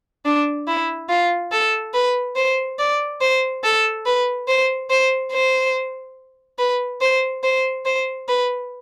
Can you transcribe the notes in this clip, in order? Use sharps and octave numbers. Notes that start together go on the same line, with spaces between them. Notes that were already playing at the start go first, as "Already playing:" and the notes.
D4
E4
F4
A4
B4
C5
D5
C5
A4
B4
C5
C5
C5
B4
C5
C5
C5
B4